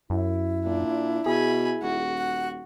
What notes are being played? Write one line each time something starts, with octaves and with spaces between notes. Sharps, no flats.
F#2 E4
A#2 D4
B2 G#4 G#5 B5
D#1 F#4
F#5